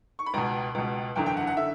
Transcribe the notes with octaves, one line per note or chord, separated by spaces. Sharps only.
C#6
B5
C#2 B2 A#5
C#2 B2
F#1 E2 D3 G5
G5
F#5
F#5
D3 E5